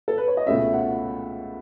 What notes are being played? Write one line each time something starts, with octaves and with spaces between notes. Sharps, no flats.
A4
B4
C#5
D#5
C#2 B2 A3 C#4 E5
F#5